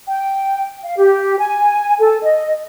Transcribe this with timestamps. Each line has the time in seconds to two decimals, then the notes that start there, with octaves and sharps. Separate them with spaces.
0.08 G5
0.83 F5
0.97 G4
1.39 G#5
1.99 A4
2.22 D#5